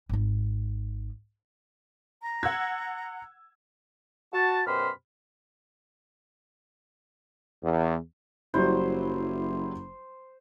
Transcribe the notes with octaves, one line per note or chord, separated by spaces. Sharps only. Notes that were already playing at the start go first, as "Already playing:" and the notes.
G#1 D#4
A#5
F#5 E6 G#6
F#4 A5
F#2 B2 G4 C5 B5 F6
E2
F#1 F#3 G3 E4 C5